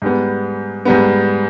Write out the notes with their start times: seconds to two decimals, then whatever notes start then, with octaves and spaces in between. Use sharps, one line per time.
0.02 G#2 G3 B3
0.85 G#2 G3 B3